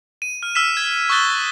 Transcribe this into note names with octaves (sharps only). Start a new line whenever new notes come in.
D#7
F6
E6 F6 B6 E7
G#6
C#6 D#6 F6 F#6 A6 G7